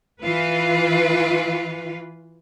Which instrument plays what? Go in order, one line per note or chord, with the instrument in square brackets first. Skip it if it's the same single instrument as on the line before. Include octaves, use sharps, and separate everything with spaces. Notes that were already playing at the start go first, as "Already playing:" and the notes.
[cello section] E3 F4 B4